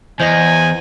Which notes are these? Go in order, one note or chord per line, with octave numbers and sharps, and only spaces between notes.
E2 C5 D#5 G#5 A#6